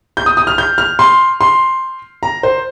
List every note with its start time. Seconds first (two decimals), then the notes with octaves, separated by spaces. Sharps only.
0.17 G6
0.26 D#6
0.37 D#6
0.47 F6
0.58 G6
0.78 F6
0.99 C6
1.41 C6
2.23 A#5
2.43 C5